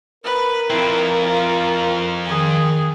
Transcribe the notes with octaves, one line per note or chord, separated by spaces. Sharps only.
A#4 B4
F2 C4 E4
F4
D#3 G#4